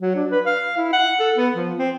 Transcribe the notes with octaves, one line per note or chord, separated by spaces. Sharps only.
F#3
D4
B4
F5
E4
F#5
A4
B3
F3
C4